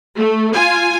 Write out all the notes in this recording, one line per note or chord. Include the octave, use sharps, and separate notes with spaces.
A3
F4 G#5